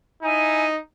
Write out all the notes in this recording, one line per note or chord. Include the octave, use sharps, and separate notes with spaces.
D#4 E4 G#5